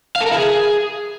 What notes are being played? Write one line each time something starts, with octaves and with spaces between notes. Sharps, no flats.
F5
A4
A#4
E4
G#4